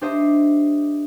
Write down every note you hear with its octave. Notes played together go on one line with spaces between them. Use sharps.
D4 G4 C5 D#5 E5